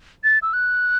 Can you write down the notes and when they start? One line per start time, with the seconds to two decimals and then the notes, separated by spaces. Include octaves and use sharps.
0.24 A6
0.42 E6
0.53 F#6